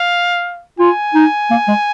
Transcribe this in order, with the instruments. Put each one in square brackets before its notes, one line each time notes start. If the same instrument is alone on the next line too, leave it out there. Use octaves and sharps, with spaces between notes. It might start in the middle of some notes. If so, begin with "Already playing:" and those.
Already playing: [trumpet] F5
[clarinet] F4 [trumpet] G#5
[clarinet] D#4
A#3
G#3